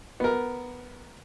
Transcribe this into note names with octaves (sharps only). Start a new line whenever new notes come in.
B3 A#4